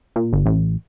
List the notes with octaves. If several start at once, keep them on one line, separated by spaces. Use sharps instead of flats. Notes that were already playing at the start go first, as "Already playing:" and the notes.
A#2
G1
A1